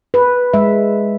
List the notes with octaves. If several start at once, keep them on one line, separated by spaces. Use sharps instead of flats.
B4
G#3 E5